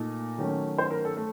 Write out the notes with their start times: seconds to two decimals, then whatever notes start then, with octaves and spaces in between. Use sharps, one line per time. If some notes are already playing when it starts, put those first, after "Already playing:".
Already playing: A#2 A3 D#4
0.38 D#3 F#3 A3 C#4
0.78 C5
0.91 A#4
1.05 A4
1.17 A3